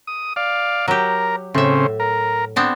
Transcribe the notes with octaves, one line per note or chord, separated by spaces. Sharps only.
D#6
D5 F5
F#3 G4 A#4
A2 C#3 C4 E5
A#4
B3 C4 D4